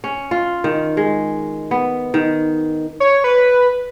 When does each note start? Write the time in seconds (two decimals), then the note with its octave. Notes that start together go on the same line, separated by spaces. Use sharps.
0.04 C#4
0.31 F4
0.64 D#3
0.97 G#3
1.71 B3
2.14 D#3
3.00 C#5
3.24 B4